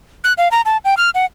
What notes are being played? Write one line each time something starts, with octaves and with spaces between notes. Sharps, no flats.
F#6
F5
A#5
A5
G5
F6
F#5